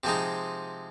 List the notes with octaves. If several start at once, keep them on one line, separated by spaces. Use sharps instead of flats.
C3 F3 G#3 D#4